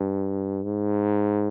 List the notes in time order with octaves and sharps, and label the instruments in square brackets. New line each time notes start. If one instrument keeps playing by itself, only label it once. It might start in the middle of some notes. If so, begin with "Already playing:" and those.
Already playing: [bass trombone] G2
G#2